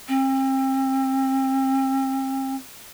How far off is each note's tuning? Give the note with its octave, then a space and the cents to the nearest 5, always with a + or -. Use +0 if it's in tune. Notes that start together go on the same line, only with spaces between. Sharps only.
C4 +35